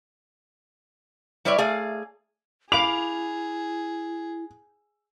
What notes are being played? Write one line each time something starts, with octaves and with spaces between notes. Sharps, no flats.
G3 E4 B4 C#5 D5 E5
A3 G#4 D5 F5
E4 G#4 F5 B5 D6 F7